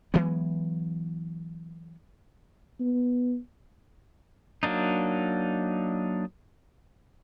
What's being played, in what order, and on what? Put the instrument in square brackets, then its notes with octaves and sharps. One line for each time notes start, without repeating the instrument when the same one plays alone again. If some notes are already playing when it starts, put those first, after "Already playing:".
[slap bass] E3 F#3 G#3 B3
[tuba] B3
[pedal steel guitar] F#3 A#3 D4 D#4